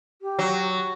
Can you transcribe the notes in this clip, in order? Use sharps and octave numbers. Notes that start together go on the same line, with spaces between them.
G4
F#3